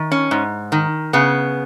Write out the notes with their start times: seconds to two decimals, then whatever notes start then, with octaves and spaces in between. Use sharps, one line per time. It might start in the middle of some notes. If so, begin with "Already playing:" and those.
Already playing: D#3
0.12 C#4
0.31 G#2
0.72 D#3
1.13 C#3 B3